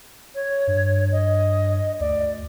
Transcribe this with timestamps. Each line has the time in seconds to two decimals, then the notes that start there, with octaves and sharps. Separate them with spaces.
0.35 C#5
0.67 G2
1.12 D#5
2.00 D2 D5